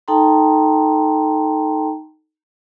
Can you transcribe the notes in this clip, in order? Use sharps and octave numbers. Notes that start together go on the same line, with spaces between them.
D#4 A4 G5 A5 A#5 C6